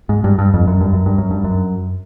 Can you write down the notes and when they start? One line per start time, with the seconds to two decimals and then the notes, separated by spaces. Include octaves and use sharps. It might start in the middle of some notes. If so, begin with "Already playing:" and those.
0.09 G#2
0.24 G2
0.38 G2
0.54 F2
0.67 F#2
0.81 G2
0.93 F#2
1.06 G2
1.18 F#2
1.31 G2
1.44 F#2